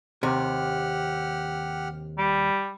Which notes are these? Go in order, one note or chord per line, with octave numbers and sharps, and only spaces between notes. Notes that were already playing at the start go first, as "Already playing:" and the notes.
D#2 C3 G4 F#5 F6
G3